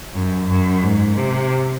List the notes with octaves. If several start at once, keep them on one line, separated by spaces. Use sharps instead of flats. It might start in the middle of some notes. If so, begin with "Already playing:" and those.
F#2
F#2
G#2
C3